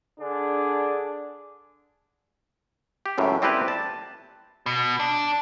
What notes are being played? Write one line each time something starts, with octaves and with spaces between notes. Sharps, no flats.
D3 D4 G#4
G4
C#2 F#2 A2
G3 C4 E4 G4 B4 E5
A5
B2
D4